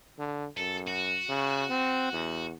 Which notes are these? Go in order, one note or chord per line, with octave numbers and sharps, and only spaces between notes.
D3
F#2 A4
F#4
C#3
C4
E2